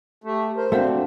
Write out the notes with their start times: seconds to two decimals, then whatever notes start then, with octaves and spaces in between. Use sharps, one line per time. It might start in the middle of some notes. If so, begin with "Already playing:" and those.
0.24 A3 G4
0.56 A#4 C5
0.72 A3 C4 D4 F#4 F5 F#5